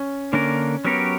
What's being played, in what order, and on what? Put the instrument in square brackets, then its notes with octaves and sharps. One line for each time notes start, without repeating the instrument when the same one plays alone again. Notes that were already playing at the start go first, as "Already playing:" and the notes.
Already playing: [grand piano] C#4
[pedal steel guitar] D3 A#3 D4 A#4 [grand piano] C#4
[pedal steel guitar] F#3 C#4 G4 A#4 C#5 [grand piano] B3